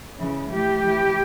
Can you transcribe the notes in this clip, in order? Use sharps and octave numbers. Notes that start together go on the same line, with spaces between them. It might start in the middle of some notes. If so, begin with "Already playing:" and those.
C#3 E3
A2 E3 G4
A2 E3